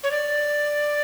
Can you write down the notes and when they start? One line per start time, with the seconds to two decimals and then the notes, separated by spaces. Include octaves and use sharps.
0.03 C#5
0.11 D5